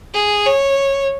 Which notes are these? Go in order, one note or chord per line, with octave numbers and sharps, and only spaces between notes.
G#4
C#5